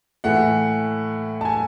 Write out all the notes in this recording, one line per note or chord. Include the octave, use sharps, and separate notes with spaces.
A2 E3 A3 F#5
A5
G#5